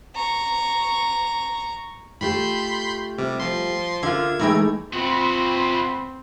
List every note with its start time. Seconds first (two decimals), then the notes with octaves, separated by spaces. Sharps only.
0.15 A#5 C#6
2.21 A3 F4 G4 B5 C6 G6
3.18 C3 G3
3.40 F3 C6
4.03 D3 F4 A#4 E5 G#6
4.39 A2 E3 G#3 A3 D#4 G5
4.93 C3 C4 F4 F#4 B5 C6